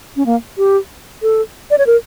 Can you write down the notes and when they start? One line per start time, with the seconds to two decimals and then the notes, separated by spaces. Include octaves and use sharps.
0.16 C#4
0.26 A#3
0.58 G4
1.22 A4
1.71 D5
1.78 C#5
1.87 A#4